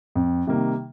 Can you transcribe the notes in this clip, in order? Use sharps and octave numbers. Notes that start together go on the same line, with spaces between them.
F2
C3 D#3 G3 A#3